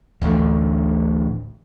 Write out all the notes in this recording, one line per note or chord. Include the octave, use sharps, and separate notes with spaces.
D1 A1 D2 D3